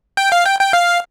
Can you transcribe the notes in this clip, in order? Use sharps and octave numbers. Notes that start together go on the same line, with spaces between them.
G5
F5
G5
G5
F5